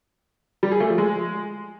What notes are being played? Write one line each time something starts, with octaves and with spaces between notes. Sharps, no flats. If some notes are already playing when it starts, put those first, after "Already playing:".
G3
G#4
A3
F3
G#3